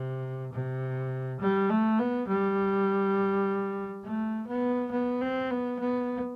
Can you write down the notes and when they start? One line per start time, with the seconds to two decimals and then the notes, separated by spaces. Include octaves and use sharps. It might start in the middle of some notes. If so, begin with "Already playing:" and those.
Already playing: C3
0.53 C3
1.41 G3
1.70 A3
1.99 B3
2.28 G3
4.04 A3
4.48 B3
4.92 B3
5.21 C4
5.50 B3
5.79 B3